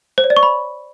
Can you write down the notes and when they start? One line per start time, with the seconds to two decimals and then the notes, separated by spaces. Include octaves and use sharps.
0.18 C5
0.24 C#5
0.30 D5
0.37 C#6
0.43 B5